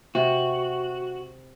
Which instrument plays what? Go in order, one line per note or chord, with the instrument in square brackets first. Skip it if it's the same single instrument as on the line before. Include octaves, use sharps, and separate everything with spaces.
[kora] C3 [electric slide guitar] F#4